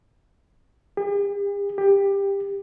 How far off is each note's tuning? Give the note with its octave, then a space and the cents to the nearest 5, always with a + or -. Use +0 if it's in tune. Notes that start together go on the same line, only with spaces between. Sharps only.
G4 +45
G4 +15